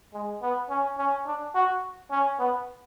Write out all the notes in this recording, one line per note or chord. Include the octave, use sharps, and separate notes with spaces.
G#3
B3
C#4
C#4
D4
F#4
C#4
B3